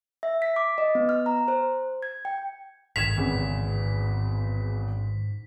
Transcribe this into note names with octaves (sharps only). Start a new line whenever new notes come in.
E5
B6
D6
D#5
B3
F6
A#5
C5
G#6
G5
A1 G#2 D#3 G#6 B6 E7 F7
G#1 E2 G#2 C#3